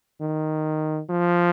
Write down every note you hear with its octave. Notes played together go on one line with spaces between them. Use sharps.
D#3
F3